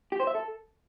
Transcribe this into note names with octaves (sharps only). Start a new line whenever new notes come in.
G4
C5
E5
A4